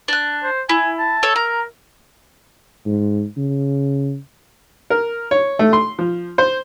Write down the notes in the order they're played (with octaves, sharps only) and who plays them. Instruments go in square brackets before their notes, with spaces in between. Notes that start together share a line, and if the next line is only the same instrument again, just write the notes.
[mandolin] D4 F#6
[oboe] C5
[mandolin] E4 [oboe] G#5
[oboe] A5
[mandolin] A4 C#5
[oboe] A#4 [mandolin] A#5
[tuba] G#2
C#3
[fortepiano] A#4
C#5
A3
C6
F3
C5